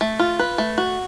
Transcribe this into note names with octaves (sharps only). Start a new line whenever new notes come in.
A3
F4
B4
A3
F#4